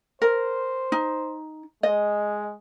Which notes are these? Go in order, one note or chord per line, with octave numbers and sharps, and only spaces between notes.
A#4 C5
D#4
G#3 D#5